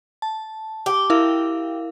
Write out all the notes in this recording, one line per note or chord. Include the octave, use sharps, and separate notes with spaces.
A5
G4
E4 A#4 F5